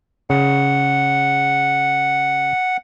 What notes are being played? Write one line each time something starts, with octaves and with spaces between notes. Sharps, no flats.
C#3 F#5